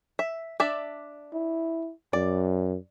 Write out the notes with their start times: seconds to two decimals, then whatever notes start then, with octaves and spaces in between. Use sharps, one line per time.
0.19 E5
0.60 D4 D5 E5
1.33 E4
2.13 F#2 D5